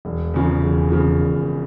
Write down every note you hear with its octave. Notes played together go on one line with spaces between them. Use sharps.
E1
E2 C#3 F3
E1
E2 C#3 F3
E1